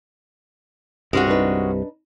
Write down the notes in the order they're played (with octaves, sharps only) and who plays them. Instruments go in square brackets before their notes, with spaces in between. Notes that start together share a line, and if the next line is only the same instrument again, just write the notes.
[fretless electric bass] C2 G2 C3 [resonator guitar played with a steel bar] G#3 C#4 F#4
[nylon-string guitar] D4 D#4 B4